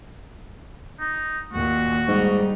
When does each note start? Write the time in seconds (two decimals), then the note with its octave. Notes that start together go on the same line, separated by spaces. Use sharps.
1.00 D#4
1.53 D#2 A#2 F#4
2.08 G#2 G3 D#4